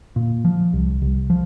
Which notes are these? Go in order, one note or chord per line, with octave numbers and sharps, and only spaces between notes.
A#2
F3
C2
C2
F3